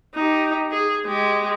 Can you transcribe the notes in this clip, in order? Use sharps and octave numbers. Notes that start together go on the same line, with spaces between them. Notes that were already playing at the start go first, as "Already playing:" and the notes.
D#4 G4
G#4
G#3 G4